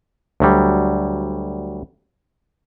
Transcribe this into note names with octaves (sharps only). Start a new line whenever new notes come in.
D2 F#3 G3